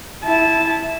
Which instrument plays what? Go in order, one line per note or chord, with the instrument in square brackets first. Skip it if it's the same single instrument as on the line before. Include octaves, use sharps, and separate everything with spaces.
[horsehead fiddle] E4 A5